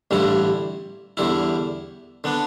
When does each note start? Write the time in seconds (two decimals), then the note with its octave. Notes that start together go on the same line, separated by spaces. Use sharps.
0.11 A1 G2 D3 G3 E4
1.17 E2 D3 G3 E4
2.24 D3 B3 D4